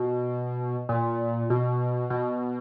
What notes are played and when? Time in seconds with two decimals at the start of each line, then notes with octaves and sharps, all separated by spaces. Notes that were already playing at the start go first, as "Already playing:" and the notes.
Already playing: B2
0.89 A#2
1.50 B2
2.10 B2